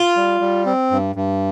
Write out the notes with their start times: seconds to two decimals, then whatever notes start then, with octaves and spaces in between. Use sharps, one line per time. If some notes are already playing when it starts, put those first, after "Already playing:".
Already playing: F4
0.16 G3
0.41 G3
0.66 C4
0.91 G2
1.16 G2